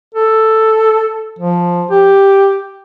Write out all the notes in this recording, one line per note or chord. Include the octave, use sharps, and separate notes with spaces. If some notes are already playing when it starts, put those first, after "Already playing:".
A4
F3
G4